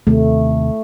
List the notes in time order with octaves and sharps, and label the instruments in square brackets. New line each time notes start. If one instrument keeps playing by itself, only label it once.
[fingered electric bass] D#2 C3 [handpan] A3